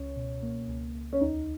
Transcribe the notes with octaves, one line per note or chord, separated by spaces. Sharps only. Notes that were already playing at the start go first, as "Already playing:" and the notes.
Already playing: C#2 C#4
B2
A#3
C#2
C#2
C#4
D#2 D#4